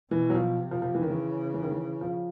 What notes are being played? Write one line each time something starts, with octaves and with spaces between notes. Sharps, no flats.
B2 E3
F#3
F3
C3
F3
F3
E3
D#3
C#3 E3
E3
D#3
E3
F3